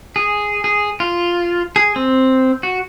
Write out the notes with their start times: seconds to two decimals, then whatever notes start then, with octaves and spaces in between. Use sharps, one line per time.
0.16 G#4
0.64 G#4
1.00 F4
1.76 G#4
1.96 C4
2.63 F#4